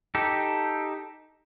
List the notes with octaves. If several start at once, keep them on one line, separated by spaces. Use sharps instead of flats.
D#4 G4 A4